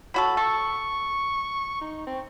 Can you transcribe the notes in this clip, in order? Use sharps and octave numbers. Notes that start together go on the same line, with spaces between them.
F#3 F#4 A4 B5
A4 C#6
D#4
C4